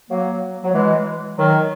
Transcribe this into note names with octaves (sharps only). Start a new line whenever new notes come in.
F#3 A#3
F#3
E3 G#3
D#3 F#3